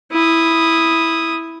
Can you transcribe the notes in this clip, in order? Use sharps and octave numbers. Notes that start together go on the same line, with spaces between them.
E4 D#6